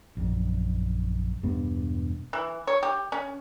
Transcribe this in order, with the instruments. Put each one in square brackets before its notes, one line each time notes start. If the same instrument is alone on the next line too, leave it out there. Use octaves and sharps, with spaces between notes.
[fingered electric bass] A#1 F#2
E1 G2 G3 B3
[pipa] E3
C#5
G4
C#4